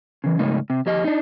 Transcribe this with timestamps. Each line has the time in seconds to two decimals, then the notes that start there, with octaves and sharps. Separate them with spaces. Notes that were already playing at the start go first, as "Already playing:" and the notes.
0.24 C#3 E3
0.39 G#2 C#3 A3 D#4
0.70 C3
0.86 F2 G4 D#5
1.04 D4 D#4